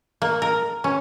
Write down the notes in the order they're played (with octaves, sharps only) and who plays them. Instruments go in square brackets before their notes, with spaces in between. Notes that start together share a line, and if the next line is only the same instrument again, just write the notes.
[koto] A#3
A#4
C#4